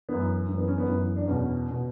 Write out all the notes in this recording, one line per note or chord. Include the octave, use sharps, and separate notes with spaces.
F#2 E3 B3
F#2 E3
B3
C#4
B3
F#2 E3
D4
E2 B2 C#4
B2